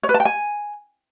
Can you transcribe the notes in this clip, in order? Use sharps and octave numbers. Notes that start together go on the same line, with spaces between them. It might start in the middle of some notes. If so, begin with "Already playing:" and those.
C#5
B4
A5
G5
G#5